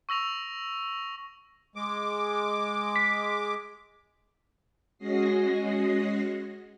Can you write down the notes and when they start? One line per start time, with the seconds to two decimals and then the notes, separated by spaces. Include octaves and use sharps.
0.09 C#6 E6 A#6 F7
1.76 G#3 D6
2.96 B6
4.98 G#3 C#4 F#4 D#5 A#6 C7